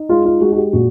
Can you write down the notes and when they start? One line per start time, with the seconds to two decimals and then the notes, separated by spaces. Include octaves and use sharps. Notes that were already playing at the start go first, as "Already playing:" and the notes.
Already playing: D#4
0.09 G#3 F4
0.25 F4
0.41 G#3 F#4
0.52 F#4
0.57 G4
0.73 A#2 F#4